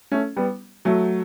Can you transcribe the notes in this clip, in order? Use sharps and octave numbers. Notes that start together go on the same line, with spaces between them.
A3 C#4
G3 B3
F#3 A3